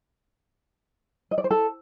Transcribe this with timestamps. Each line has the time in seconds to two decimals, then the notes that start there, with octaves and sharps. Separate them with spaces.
1.31 D#5
1.38 D5
1.44 C5
1.51 A4